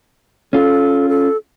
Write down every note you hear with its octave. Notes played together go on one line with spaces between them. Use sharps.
C#4 F4 A4
A4